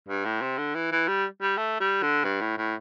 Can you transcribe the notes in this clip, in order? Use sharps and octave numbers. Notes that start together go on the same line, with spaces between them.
G2
A2
C3
D3
E3
E3
G3
G3
A3
G3
D3
G2
A2
A2